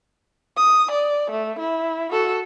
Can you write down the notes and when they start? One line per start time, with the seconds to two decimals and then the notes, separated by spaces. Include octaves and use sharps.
0.57 D#6
0.91 D5
1.30 A3
1.59 E4
2.12 F#4 A4